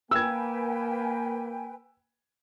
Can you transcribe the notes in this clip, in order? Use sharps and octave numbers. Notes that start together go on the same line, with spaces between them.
A#3 B4 G5 G#5 E6 G#6